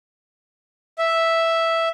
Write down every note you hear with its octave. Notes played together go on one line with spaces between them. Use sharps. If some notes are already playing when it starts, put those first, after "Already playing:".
E5